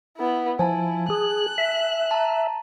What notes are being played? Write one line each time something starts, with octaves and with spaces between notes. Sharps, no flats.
B3 E4
F3 E4 G#5 A5
G#4 F#6
E5
A5 A#5